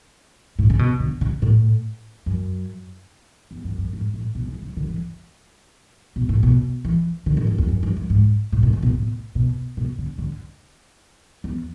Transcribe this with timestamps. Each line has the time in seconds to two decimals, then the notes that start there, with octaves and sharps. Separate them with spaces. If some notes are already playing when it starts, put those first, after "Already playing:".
0.59 A2
0.70 C#3
0.79 B2
1.00 D3
1.21 C#3
1.42 A2
2.26 F#2
3.51 E2
3.64 F#2
3.78 F#2
3.93 G#2
4.14 A2
4.35 B2
4.48 C#3
4.62 C#3
4.77 D3
4.90 E3
6.16 B2
6.29 A2
6.43 B2
6.85 E3
7.26 D3
7.37 A2
7.47 F#2
7.58 E2
7.68 F#2
7.83 F#2
7.97 F#2
8.10 G#2
8.52 A2
8.63 B2
8.73 C#3
8.83 B2
8.94 A2
9.35 B2
9.77 B2
9.99 D3
10.18 D3
11.44 E2